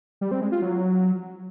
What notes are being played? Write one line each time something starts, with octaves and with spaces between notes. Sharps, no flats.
G3
C4
G#3
F4
F#3